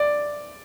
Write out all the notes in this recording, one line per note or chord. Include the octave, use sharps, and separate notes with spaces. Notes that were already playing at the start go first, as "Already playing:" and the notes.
Already playing: D5